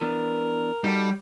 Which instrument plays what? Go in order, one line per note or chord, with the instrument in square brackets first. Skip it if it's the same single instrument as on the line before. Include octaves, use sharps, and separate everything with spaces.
[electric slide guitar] E3 B3 D4 [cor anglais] A#4
[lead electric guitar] G3 [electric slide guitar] D#4 F#4 A4